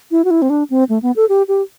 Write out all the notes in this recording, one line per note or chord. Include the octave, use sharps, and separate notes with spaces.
E4
F#4
E4
C4
D4
C4
A3
B3
A4
G4
G4